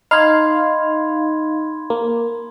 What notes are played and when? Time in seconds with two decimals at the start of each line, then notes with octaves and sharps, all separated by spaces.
0.11 D#4 F5 B5 C6 G#6
1.90 A#3